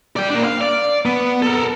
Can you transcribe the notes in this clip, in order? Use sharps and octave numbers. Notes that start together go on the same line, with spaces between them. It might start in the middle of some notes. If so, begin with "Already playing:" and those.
D5 G5
A#3 D4
F5
D5
B3
A4 A#4